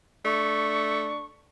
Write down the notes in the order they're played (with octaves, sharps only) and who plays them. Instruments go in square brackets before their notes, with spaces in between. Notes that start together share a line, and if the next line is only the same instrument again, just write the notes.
[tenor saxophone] A3 [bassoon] D4 [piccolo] C#6